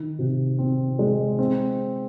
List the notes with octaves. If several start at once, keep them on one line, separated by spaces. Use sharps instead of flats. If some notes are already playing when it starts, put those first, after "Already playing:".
Already playing: D#3
C3
C4
G#3
C4